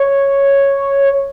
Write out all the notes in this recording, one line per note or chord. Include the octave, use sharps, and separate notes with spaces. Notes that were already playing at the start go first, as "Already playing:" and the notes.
Already playing: C#5